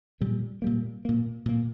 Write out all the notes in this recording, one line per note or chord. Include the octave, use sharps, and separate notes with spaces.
A#2 G3 A#3
A#2 G3 A#3
A#2 A#3
A#2 A#3